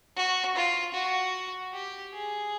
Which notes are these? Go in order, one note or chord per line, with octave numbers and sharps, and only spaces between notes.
F#4
F4
F#4
G4
G#4